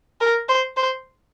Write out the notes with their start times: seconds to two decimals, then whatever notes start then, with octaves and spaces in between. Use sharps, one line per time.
0.21 A#4
0.48 C5
0.77 C5